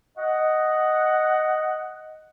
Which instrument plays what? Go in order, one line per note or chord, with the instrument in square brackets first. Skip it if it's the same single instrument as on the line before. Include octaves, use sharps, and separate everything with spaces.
[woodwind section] D#5 F#5